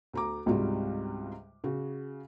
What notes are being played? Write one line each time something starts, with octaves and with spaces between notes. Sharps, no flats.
D2 A#5 D6
C#2 G#2 C3 G3 F4 F#4
C#3 F#4